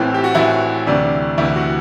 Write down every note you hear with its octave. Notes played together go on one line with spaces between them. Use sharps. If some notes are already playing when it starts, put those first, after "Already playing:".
Already playing: A1 A2 E3 C4
G4
F#4
A1 A2 E3 E4
D2 C3 E3 D4
D2 C3 E3 E4
F#4